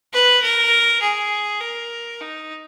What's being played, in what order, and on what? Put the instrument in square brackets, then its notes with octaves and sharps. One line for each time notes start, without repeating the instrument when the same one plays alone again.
[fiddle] B4
A#4
G#4
A#4
D#4